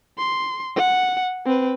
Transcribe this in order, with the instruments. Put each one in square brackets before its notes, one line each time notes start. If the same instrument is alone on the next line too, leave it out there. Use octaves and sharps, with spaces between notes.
[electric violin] C6
F#5
C4 B4